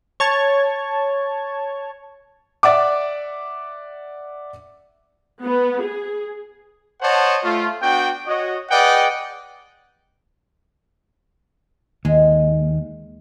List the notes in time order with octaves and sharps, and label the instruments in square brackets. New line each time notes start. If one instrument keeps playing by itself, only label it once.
[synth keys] C#5 A5 G#6
[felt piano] D5 E5 F#5 D6
[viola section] B3
G#4
[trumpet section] C5 C#5 D#5 F#5 A5
A3 F4
B3 D4 F#4 G5
F#4 C#5 D#5
G#4 B4 D5 D#5 F#5 G5
[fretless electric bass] D#2 [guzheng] G#3